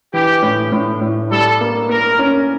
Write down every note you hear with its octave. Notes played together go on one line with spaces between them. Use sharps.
E3 G4
A2
A2
A2
G3 A4
A#3
A#3 A#4
C#4